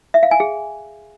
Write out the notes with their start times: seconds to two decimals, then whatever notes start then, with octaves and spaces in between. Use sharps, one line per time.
0.14 E5
0.23 F5
0.31 G#5
0.40 G#4